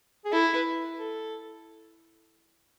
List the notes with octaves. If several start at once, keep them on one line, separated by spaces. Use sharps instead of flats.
G#4
E4 A4
B4
A4